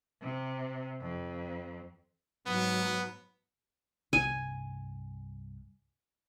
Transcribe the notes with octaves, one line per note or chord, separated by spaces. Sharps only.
C3
F2
G#2 F#3 B3
C2 G2 G#5